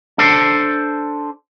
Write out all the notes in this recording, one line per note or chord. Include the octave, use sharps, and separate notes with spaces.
D4 A4 C5 D5